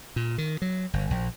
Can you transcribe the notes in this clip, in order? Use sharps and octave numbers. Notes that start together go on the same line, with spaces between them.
A#2
D#3
F#3
G1
A#1